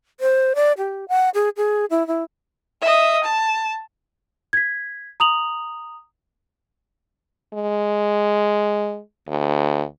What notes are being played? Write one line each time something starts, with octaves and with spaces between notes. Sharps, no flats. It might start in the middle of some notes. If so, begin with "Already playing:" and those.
C5
D5
G4
F#5
G#4
G#4
E4
E4
D#5 E5
A5
G#6 B6
A#5 D#6 F7 F#7
G#3
D2